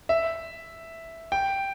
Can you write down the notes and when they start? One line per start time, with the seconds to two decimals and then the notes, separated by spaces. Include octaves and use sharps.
0.09 E5
1.32 G5